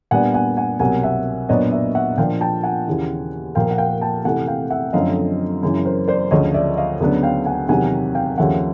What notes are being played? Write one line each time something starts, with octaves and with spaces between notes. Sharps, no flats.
A#2 G3 B3 D4 F#5 G#5
F#5 G#5
F#5 G#5
C2 B2 F#3 A#3 F#5 G#5
E5 F#5
A#2 F#3 B3 D4 C#5 D#5
D5 E5
E5 F#5
A#2 F3 A#3 D4 F5 G5
G5 A5
F#5 G#5
D#2 C#3 E3
A#2 F3 A#3 F5 G5
F#5
F5 G5
G5 A5
C3 E3 A3 F#5 G#5
F5 G5
E5 F#5
F#2 D3 F3 A3 C4 D#5 F5
F#2 C#3 E3
A#4 C5
C5 D5
D2 C#3 F3 C#5 D#5
D5 E5
D#5 F5
D2 C#3 F#3 B3 D4
F5 G5
F#5 G#5
E2 C3 D#3 F#3 F#5 G#5
F5 G5
D#2 C#3 F3 A3 C#4 E5 F#5